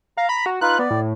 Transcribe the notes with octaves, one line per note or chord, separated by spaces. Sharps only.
F5 A#5
B5
F#4
D#4 F4 B4 F#6
B3 D5
A2